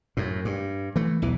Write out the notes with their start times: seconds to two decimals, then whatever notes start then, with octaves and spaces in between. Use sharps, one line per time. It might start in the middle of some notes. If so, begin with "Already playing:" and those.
0.17 F#2 A2
0.45 G2
0.96 E3 A3
1.22 B1 E2 E3